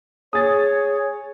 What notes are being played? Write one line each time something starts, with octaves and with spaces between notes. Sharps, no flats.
G#4 C#5 D#6 A6